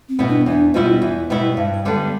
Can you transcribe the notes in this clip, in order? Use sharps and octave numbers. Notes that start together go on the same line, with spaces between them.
C4
B2 G3 B3 E4
D4
E2 D4
B2 G3 B3 E4 F4
E2
B2 G3 B3 E4
G2
D3 G3 B3 D4